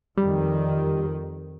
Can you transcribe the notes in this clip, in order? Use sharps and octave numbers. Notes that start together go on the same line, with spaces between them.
F2 D#3 G3